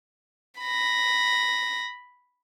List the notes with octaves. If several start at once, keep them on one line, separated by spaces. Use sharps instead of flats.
B5 A#6